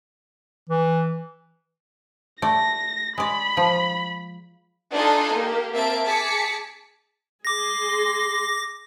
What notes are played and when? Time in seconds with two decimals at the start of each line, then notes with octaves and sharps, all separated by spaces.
0.69 E3
2.42 A3 D5 A#6
3.18 G#3 D5 B5
3.57 F3
4.92 D4 D#4 F4 A4 G#5 C6
5.34 A#3 G4
5.72 A#3 C4 E5 A5 D7
6.06 G#4 A5 D6 B6 C#7
7.45 G#4 C6 D6 A#6